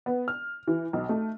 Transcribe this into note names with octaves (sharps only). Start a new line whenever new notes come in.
B3
F6
E3
B1
A3